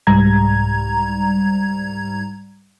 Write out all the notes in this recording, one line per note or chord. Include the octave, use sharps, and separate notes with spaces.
C2 G#2 G3 A#5 G#6